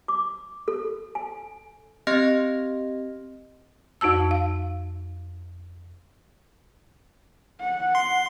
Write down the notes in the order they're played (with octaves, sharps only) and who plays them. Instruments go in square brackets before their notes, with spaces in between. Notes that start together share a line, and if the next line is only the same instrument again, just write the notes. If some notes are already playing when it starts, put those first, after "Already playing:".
[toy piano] D6
A4
G#5
[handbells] C4 G4 D#5 C6 F6 A#6
[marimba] F2 D#4 F#4 A5 E6
F5
[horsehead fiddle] F#5
[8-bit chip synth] C6